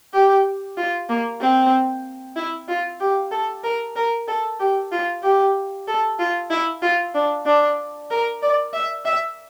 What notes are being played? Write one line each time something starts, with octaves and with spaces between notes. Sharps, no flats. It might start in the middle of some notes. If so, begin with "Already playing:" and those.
G4
F4
A#3
C4
E4
F4
G4
A4
A#4
A#4
A4
G4
F4
G4
A4
F4
E4
F4
D4
D4
A#4
D5
E5
E5